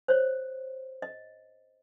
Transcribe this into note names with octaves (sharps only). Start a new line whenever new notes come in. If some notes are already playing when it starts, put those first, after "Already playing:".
C5 C#5
D#5